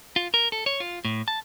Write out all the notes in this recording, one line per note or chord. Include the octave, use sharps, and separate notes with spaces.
F4
A#4
A4
C#5
F4
A2
A5